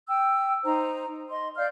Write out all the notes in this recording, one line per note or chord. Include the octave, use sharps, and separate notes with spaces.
G5 E6
D#4 C5 A#5
D#5 C6
D5 F5 F6 G6